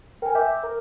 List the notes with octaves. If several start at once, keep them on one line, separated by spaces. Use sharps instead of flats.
A#4 G5 G#5
E5 D6 G6
A#4